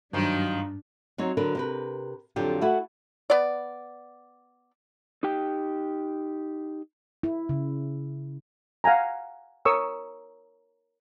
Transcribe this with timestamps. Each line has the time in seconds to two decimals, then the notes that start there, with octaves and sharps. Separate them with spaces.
0.13 G2 D#3 F3 F#3 D4
1.18 F#3 C4 D#4 C#5
1.37 D3 F#3 A#4 B4
1.55 C3 A#4 B4
2.36 F2 D3 F#3 F4 G4
2.61 A3 E4 F#4
3.30 B3 D5
5.23 D#4 G4 G5
7.23 E4
7.49 C#3
8.84 F5 F#5 G#5 A#5
9.65 A#4 C#5 C#6 D#6 E6